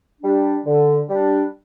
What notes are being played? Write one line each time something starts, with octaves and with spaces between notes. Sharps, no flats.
G3 D4
D3
G3 D4